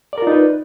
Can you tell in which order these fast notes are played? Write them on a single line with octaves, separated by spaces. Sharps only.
D5 A#4 F4 D#4 B4